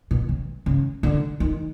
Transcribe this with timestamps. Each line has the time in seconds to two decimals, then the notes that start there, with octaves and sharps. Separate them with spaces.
0.11 B2
0.29 C#3
0.66 C#3
1.03 D3
1.40 D#3